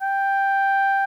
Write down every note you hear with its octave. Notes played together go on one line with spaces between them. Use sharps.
G5